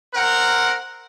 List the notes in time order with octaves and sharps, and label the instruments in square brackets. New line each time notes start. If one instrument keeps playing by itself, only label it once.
[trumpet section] C4 A#4 F#5